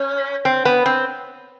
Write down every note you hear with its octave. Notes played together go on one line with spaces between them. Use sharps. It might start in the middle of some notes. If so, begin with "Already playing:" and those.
Already playing: C#4
C4
B3
C4